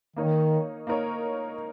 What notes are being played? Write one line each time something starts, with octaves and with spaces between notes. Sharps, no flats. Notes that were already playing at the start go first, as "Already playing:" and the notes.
D#3 A#3 D#4 A#4 C#5
A#3 D#4 A#4 C#5